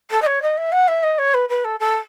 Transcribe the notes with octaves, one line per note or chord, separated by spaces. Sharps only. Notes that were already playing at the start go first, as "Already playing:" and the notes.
A4
D#5
C#5
D#5
E5
F#5
E5
D#5
C#5
B4
B4
A4
A4